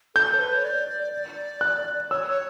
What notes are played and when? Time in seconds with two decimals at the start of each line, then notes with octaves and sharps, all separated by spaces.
0.15 A4 G6
0.34 C#5
0.39 B4
0.54 C#5
0.64 D5
0.89 D5
1.13 D5
1.61 F#6
2.11 C#5 E6
2.27 C#5